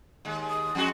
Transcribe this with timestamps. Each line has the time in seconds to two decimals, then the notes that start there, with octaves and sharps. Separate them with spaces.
0.25 D#2 G#3
0.50 D#6
0.75 F2 G#3 F#4